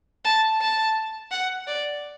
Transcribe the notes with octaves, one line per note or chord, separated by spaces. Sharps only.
A5
A5
F#5
D5